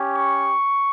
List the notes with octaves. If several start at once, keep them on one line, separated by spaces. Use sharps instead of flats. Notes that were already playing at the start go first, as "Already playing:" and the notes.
Already playing: C#4 G4
C#6